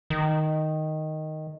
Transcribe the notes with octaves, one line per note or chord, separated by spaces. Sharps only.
D#3